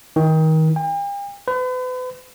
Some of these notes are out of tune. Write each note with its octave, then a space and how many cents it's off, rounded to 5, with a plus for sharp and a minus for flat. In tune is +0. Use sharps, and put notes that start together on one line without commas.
D#3 +25
G5 +45
B4 +40